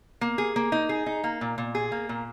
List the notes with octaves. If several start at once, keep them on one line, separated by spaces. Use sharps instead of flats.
A#3
G#4
A#3
D#4
G#4
D#4
A#3
A#2
A#2
G#4
A#3
A#2